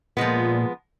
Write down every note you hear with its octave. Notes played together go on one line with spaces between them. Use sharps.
A#2 F3 G#3 B3